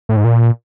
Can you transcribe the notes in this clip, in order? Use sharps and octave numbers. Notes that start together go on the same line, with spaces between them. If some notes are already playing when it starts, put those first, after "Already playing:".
A2
G#2
A#2